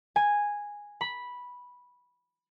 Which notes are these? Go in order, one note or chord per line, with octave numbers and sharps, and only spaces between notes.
G#5
B5